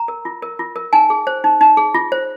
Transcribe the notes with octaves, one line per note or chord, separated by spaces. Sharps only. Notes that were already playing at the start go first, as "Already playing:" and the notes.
Already playing: A#5
A#4
F4
A#4
F4
A#4
D#4 G#5
G#4
C5
D#4
D#4
G#4
F4
C5